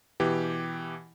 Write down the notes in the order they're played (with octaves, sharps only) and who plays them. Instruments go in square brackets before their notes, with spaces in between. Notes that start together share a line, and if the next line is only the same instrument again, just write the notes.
[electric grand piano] B2 E3 G4